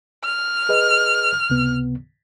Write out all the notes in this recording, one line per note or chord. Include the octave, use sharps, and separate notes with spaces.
F6
G#4 B4 D#5
C#2 C3 B3